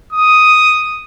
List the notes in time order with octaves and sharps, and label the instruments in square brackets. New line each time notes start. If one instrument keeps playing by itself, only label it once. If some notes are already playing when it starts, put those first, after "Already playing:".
[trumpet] D#6